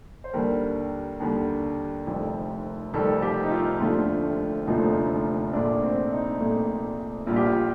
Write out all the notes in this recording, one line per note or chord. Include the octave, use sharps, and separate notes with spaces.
C5
D#2 D3 G3 A#4
D#2 D3 G3
F1 F2 D#3 G3
F1 F2 D#3 G3 A4
G4
D#4
F4
F1 D#2 D3 F3 A3 F4
F1 D#2 D3 F3 A3 D#4
A#1 A#2 A3 D4
C4
D#4
A#1 A#2 A3
A#1 A#2 G3 F4
G4
F4